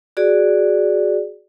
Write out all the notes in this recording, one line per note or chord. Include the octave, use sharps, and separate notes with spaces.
F#4 G#4 D5